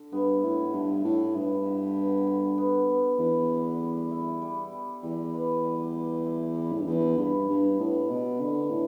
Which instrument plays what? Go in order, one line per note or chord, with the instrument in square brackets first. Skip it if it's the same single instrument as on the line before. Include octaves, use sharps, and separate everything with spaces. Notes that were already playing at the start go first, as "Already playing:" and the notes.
Already playing: [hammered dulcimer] D3
[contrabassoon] G2 [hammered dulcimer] B3
[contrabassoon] A2 [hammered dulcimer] E4
[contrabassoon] G2 [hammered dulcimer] D3
[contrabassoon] A2 [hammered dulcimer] E4
[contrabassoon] G2 [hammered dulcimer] B3
[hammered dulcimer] D3
B3
D3
B3
B3
[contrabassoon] E2 [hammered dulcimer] B4
[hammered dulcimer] G3
G3
E4
G3
G3
[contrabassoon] E2 [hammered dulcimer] G3
[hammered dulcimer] B4
G3
B4
E4
G3
[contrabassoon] A2
G2
[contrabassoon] E2 [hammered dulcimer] B3
[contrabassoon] G2 [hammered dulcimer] B4
[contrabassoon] G2 [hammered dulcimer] B4
[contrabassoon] A2 [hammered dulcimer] B3
[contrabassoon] B2 [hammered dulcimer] B4
[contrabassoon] D3 [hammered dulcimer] B4
[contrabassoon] A2 [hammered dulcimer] E3